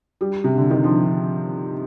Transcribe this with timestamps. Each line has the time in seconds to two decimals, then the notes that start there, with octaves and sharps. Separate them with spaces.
0.21 G3
0.44 C3
0.57 D3
0.71 D#3
0.84 F3